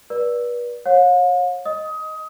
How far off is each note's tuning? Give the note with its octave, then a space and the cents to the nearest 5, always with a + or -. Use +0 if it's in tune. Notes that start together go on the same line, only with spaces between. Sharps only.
B4 -35 D5 +0
C#5 -30 F5 +45
D#5 +0 D#6 +25